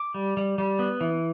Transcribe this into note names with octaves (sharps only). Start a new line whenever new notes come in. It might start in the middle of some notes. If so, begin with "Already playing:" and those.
Already playing: D6
G3
G3
G3
B3
E3